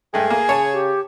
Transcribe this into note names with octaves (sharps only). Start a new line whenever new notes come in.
G2 G#3 A3 G#4 G5
A#3 G#5
C#3 C#5 A5
G4